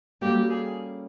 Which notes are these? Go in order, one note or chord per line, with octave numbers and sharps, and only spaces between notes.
G3 A#3 C#4 F#4 G4 A4
G#4